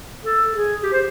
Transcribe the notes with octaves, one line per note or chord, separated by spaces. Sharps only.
A4
G#4
G4
C5